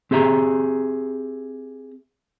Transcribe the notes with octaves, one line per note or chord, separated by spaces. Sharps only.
C4 G4 G#4 E5 A#5